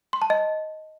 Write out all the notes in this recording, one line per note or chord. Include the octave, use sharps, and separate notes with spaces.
C6
A5
D#5